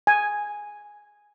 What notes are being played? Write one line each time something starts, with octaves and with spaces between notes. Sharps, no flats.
G#5